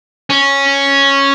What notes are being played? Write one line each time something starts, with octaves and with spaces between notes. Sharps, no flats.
C#4